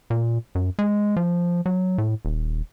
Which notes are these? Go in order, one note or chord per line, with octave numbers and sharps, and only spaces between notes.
A#2
F#2
G#3
F3
F#3
A2
D#1